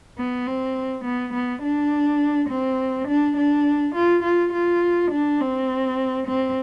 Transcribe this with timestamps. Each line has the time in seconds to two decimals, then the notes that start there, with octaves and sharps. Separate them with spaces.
0.18 B3
0.47 C4
1.04 B3
1.34 B3
1.63 D4
2.50 C4
3.08 D4
3.37 D4
3.95 F4
4.24 F4
4.53 F4
5.11 D4
5.40 C4
6.27 C4